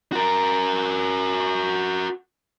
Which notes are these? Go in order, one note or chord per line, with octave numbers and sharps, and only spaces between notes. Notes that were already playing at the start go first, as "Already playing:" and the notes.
F#4 A#4